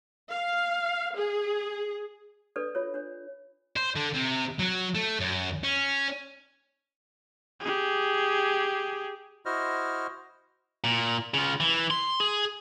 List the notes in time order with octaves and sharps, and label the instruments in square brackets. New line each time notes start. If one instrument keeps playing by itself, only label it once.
[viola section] F5
G#4
[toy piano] D4 A4 B4 D5
F4 C#5
D4 C#5
[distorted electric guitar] C5
D3
C3
F#3
A3
F#2
C#4
[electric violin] G4 G#4
[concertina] E4 F#4 C5 D#5 F6
[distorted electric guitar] A#2
C#3 F4
E3
C6
G#4